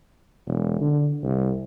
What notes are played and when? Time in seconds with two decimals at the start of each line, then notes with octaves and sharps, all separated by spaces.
0.47 E1
0.81 D3
1.23 C2